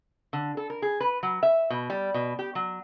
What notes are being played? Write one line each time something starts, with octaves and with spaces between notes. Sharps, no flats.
D3
A4
A#4
G#4
B4
F#3
E5
B2
G3
B2
G4
F#3